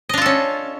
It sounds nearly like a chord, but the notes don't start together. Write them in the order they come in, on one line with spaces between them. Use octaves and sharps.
D#5 D4 F4 A4 C#4